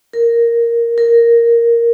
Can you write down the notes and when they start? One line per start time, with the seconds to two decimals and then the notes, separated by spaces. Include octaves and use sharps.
0.13 A#4
0.98 A#4